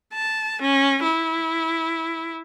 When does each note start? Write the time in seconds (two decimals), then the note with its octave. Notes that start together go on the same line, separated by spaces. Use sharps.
0.13 A5
0.61 C#4
1.03 E4